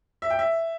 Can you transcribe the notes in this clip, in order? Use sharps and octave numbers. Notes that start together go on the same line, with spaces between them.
E5
G5
E5